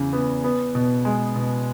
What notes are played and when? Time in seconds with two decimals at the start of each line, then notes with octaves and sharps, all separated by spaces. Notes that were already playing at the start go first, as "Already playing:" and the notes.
Already playing: E2 C#3
0.13 B3
0.44 B3
0.75 B2
1.05 G#3
1.36 B2